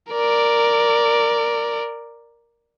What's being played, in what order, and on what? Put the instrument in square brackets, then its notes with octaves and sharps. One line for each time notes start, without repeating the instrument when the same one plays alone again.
[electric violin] A#4 D5